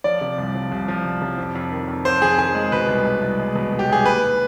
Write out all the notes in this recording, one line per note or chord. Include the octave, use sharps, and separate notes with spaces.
F3 D5
C3
C2
F3
C2
F3
C2
C3
F2
F2
D#3
F2
F2 C5
F2 G#4
D#3 G#4
G#3
B2 B4
C2
G#3
C2
G#3
B2
B2
G4
C2 G#4
D#2 B4